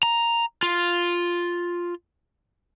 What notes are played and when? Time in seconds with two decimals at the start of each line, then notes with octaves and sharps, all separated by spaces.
0.03 A#5
0.63 F4